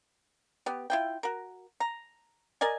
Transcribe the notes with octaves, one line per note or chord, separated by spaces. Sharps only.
B3 G4
E4 F4 G5
F#4 A#4
A#5
A#4 D5 D#5 G#5